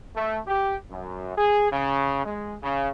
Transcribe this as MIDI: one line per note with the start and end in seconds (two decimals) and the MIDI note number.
0.15 0.39 57
0.47 0.76 67
0.90 1.36 42
1.37 1.69 68
1.71 2.24 49
2.24 2.55 56
2.63 2.89 49